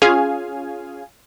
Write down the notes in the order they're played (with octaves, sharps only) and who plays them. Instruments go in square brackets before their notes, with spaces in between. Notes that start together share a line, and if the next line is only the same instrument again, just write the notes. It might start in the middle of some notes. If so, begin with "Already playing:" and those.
[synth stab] C#4 F4 G#4 F5 G#5